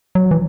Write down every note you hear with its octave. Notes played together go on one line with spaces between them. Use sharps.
F#3
E3